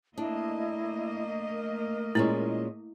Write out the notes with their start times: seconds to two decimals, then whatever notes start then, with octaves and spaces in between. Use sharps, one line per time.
0.18 A3 A#3 D4 E4 D#5
1.50 A#4
2.15 A#2 G#3 C#4 E4